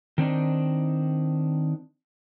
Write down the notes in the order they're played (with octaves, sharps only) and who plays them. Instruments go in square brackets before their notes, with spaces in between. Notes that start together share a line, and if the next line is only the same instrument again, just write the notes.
[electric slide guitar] D#3 C4 D4 D#4